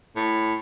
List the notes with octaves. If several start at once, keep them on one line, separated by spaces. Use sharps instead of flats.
A2